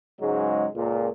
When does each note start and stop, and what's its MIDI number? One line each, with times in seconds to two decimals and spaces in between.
0.21 0.67 44
0.21 0.67 49
0.21 0.67 54
0.21 0.67 56
0.75 1.08 37
0.75 1.08 46